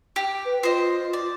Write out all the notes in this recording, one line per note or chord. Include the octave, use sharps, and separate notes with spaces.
G4
B4
F4 C5 D#5
D5